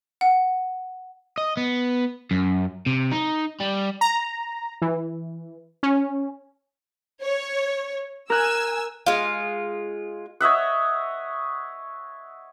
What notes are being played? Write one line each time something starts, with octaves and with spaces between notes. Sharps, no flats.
F#5
D#5
B3
F#2
C3
D#4
G3
A#5
E3
C#4
C#5
A#4 G#5 E6 F#6
G#3 F4
C#5 D#5 E5 F#5